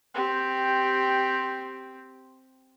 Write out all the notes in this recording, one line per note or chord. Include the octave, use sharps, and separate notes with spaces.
C4 G4